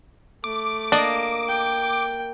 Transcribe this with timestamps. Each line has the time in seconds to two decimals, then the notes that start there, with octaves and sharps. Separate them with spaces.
0.44 A3 D6
0.92 A#3 D4 D#5
1.49 G5